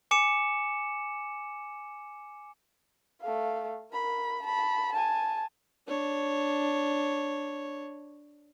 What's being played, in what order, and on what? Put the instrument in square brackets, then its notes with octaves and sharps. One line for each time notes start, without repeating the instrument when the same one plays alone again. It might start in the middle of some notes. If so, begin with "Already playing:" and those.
[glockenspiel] G#5 D6 C#7 E7
[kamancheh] A3 F5
A#4 B5
A5 B5
G#5 A5
[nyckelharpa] D4 C#5